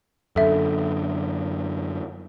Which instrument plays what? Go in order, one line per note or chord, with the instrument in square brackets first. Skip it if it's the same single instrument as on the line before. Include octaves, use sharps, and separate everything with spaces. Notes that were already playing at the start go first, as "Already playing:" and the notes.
[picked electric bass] F#2 D3 [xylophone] A4 E5